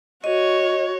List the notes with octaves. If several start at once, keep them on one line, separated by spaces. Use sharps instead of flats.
F#4 C#5 D#5